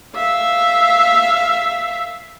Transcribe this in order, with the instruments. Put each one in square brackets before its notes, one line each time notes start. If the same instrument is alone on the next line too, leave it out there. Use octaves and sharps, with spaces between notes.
[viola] E5 F5